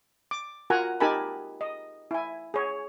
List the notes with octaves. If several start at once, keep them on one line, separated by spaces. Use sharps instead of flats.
D6
F4 F#4 A#4 F#5 G#5 A#5
D#4 G4 A#4 G#5 A5 B5
D#5
E4 G#5
G#4 C#5